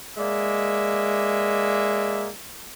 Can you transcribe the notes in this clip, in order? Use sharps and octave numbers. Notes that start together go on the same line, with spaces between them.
G#3 A#3 D5 E5